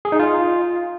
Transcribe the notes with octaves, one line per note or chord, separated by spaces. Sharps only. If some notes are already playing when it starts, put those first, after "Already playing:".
G#4
D#4
F4